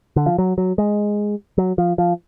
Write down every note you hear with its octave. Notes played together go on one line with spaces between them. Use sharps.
D3
F3
F#3
F#3
G#3
F#3
F3
F3